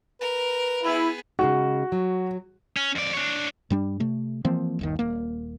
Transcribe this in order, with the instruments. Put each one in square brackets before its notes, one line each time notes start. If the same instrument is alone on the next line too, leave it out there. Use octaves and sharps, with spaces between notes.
[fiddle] A#4 [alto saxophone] B4
[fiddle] B3 G#4 [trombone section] E4
[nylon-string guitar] C#3 G#3 D#4 [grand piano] F#4
[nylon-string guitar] F#3
[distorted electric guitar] C#4
F2 D5
D4 C#5
[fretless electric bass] G2 G3 D4
C3 A3
E3 F3 A#3 C4
G1 D#2 D#3
D#1 A#3